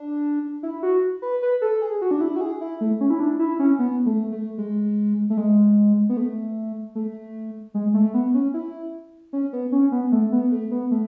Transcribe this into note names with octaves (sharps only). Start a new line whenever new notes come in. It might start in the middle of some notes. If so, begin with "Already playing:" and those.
Already playing: D4
E4
F#4
B4
B4
A4
G#4
F#4
D4
E4
F#4
G#4
E4
A3
C#4
E4
D4
E4
C#4
B3
A3
A3
G#3
A3
G#3
B3
A3
A3
G#3
A3
B3
C#4
E4
C#4
B3
C#4
B3
A3
B3
A3
B3
A3